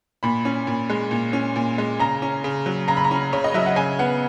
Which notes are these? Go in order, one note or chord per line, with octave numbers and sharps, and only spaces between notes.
A#2 B5
C#4
A#2
G#3
A#2
C#4
A#2
G#3
C#3 A#5
C#4
C#3
F#3
C#3 A#5
B5
A#5
C#4
C#3 C#5
D#5
F#3 E5
F#5
C#3 G#5
B3 F#5